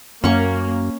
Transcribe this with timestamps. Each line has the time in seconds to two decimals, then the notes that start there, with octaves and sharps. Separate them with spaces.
0.24 F#2 A#3 C#4 F#5 C#6